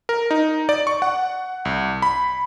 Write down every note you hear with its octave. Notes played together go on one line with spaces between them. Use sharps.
A#4
D#4
D5
C#6
F#5
C2
B5